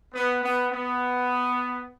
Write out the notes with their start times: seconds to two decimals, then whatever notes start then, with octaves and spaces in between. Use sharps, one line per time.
0.14 B3
0.43 B3
0.72 B3